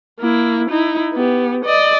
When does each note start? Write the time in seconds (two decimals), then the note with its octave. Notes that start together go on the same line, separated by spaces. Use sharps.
0.20 A#3 E4
0.71 D#4 E4
1.14 B3 G4
1.65 D5 D#5